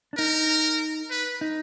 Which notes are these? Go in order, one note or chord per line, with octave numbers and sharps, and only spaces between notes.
D4
D#4 A#4
B4
D#4